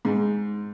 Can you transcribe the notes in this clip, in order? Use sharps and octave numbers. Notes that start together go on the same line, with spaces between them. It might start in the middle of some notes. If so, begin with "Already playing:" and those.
G#2